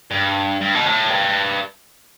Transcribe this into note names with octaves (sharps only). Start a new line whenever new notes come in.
G2
G2
B2
A2
G2